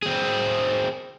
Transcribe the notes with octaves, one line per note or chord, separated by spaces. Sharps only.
C4 G#4